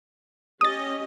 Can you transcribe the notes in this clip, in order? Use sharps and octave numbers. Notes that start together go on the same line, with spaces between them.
C#4 G4 D#5 D#6 A6